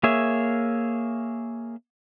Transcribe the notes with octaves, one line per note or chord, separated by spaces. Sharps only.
A#3 G#4 C#5 E5